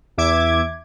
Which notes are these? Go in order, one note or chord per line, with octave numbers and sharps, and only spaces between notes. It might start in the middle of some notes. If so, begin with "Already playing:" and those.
E2 E5 D6 G#6